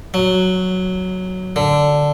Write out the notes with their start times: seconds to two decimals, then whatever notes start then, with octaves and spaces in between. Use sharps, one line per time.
0.14 F#3
1.56 D3